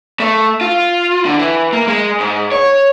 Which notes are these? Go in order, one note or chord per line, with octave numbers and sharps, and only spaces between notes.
A3
F4
D3
E3
A#3
G#3
G#2
C#5